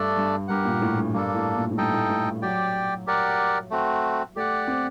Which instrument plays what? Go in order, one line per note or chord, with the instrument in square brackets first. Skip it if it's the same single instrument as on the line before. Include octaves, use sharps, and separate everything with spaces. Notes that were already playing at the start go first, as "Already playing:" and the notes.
Already playing: [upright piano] G2 [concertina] A3 D4 A4 D5
[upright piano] G2
[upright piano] G2 [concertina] G4 A#4 F#5
[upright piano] A#2
A2
G2
[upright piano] G2 [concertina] A#3 D4 A4
[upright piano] A2
A#2
A2
[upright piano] G2 [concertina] D#4 A4 D#5 G5
[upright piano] A2
A2
[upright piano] F#3 [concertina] G4 D5 G5
[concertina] G4 A#4 D5 F#5
A3 C4 F#4
[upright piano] A3 [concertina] G4 D5 F#5
[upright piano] C4